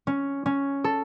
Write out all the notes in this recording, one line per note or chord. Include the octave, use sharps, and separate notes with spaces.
C#4
C#4
A4